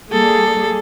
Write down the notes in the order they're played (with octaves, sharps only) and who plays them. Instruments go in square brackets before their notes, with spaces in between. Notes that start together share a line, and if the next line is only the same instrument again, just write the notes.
[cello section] G3 A#3 G#4 [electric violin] A4